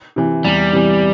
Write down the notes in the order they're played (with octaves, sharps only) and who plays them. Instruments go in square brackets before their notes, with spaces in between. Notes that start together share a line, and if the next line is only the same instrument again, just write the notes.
[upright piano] C3 E3
[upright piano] E2 [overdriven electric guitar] G3
[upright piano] C3 E3